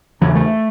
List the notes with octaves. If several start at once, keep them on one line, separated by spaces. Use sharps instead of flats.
E1 E2 C#3 F#3
A3